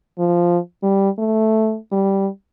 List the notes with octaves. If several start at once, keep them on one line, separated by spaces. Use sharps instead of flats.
F3
G3
A3
G3